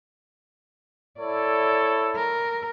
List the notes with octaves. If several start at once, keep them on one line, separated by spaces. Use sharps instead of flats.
E4 A4 C#5 D5
A#4